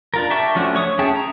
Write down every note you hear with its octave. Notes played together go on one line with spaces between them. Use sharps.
D4 F4 A#4
G4 E5 G5 A5 C#6
F3 A3 C#4 D4 F#4
C#5 C#6 D#6
C#4 G#4 E5 G5 A5
A#5